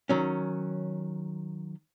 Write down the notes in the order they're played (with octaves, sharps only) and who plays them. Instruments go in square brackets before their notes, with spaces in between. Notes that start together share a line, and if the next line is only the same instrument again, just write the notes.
[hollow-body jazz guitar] D#3 F#3 C#4